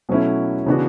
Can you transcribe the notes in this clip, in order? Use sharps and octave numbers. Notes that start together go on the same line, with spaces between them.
B2 F#3 A3 C#4 E4
C#3 E3 B3 D4 F#4